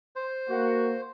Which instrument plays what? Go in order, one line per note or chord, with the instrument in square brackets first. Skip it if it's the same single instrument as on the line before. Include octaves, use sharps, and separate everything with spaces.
[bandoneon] C5
[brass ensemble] A#3 F#4